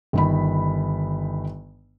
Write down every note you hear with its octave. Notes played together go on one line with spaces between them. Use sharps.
G1 D#3 B5